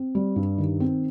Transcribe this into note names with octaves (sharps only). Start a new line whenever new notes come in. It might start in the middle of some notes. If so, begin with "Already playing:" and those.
Already playing: C4
G3
G2
D#3
C4